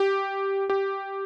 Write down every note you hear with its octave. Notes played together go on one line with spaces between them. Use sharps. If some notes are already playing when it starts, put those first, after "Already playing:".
Already playing: G4
G4